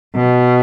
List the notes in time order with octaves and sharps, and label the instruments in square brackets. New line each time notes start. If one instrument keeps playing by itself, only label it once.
[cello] B2